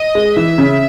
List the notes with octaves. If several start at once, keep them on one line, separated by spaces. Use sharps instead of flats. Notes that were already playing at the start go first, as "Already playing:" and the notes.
Already playing: D#5
G#3
E3 E5
C#3